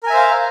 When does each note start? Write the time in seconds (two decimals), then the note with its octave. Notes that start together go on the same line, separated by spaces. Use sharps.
0.03 A#4
0.07 G#5
0.10 E5
0.13 C5
0.17 F5